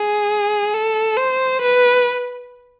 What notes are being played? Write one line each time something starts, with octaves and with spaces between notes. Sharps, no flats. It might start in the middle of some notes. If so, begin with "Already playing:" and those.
Already playing: G#4
A4
C5
B4